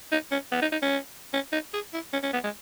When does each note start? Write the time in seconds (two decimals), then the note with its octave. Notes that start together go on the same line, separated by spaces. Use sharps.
0.12 D#4
0.32 C#4
0.52 B3
0.62 D#4
0.72 D#4
0.82 C#4
1.33 C#4
1.52 D#4
1.74 G#4
1.93 E4
2.13 C#4
2.23 C#4
2.33 B3
2.44 G#3